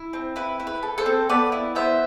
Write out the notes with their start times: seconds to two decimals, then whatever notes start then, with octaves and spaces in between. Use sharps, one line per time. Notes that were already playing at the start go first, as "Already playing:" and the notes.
Already playing: E4
0.13 C4
0.36 E4 B4
0.60 E4
0.67 B4
0.83 A4
0.98 A4 C5
1.06 C4
1.29 B3 B4 D5
1.52 E4
1.75 B3 C5 E5